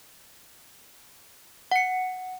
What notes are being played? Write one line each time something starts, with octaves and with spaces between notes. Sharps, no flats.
F#5 C#7